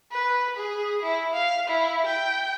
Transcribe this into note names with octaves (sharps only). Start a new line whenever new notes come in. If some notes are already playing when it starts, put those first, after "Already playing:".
B4
G#4
E4
F5
E4
G5